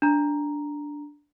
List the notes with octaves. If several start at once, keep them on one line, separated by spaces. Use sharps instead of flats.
D4 A#5